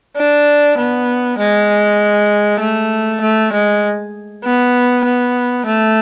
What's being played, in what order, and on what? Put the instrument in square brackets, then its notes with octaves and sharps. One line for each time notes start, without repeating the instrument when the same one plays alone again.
[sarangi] D4
B3
G#3
A3
A3
G#3
B3
B3
A3